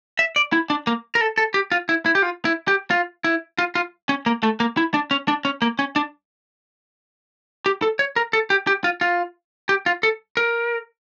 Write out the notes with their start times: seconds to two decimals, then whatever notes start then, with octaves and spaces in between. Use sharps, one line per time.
0.19 E5
0.36 D5
0.53 E4
0.70 D4
0.87 A#3
1.15 A#4
1.21 A4
1.38 A4
1.54 G4
1.72 F4
1.89 E4
2.06 E4
2.15 G4
2.22 F4
2.45 E4
2.68 G4
2.91 F4
3.24 E4
3.58 F4
3.75 F4
4.09 C#4
4.26 A#3
4.43 A3
4.60 A#3
4.77 E4
4.94 D4
5.11 C#4
5.28 D4
5.45 C#4
5.62 A#3
5.79 C#4
5.96 D4
7.66 G4
7.82 A4
7.99 C#5
8.16 A#4
8.33 A4
8.50 G4
8.67 G4
8.84 F4
9.01 F4
9.69 G4
9.86 F4
10.03 A4
10.37 A#4